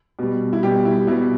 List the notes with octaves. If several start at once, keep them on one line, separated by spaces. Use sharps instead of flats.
B2 G3
E4
B2 G3 G4
E4
B2 G3 E4